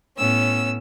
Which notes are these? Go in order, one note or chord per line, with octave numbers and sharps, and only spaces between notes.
A2 B3 C#4 E6